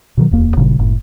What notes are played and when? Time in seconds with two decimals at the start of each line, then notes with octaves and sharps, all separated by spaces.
0.17 B2 D#3 F#3
0.31 D1 E2 A#3
0.57 G1 A#2 C#3 G3
0.79 F#1 A2